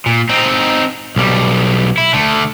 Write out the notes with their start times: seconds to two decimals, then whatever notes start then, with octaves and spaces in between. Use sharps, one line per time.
0.06 A#2
0.29 C4 D#4
1.16 B1 G3
1.98 E4
2.14 D3 A3